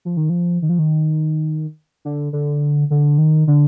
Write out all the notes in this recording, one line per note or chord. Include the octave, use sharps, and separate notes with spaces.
F3
D#3
F3
D#3
F3
D#3
D3
D3
D3
D#3
D3